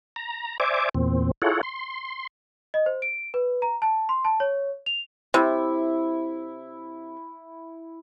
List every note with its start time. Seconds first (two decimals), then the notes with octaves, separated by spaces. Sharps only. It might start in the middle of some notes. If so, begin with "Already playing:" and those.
0.16 A#5
0.60 C5 D5 E5 G#5 D6
0.95 E2 A#2 C4
1.42 E4 F4 G#4 A4 C#5 F#5
1.63 C6
2.74 D#5
2.86 C5
3.02 D7
3.34 B4
3.62 A#5
3.82 A5
4.09 C6
4.25 A5
4.40 C#5
4.86 F7
5.34 C3 E4